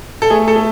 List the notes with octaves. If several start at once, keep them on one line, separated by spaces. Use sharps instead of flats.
A4
A3 G#4
A4
A3